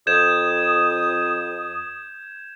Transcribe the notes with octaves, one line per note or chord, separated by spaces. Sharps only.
F2 D#6 G6 G#6 E7